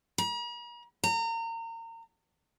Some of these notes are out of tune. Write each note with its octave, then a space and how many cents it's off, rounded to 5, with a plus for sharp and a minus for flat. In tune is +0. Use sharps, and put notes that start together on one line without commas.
A#5 +45
A#5 -30